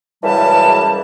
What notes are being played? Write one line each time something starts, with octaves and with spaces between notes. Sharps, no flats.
C#2 F#2 E3 G3 A5